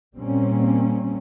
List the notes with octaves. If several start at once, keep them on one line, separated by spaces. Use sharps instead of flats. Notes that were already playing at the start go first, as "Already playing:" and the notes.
A#2 G3 A#3 C4 C#4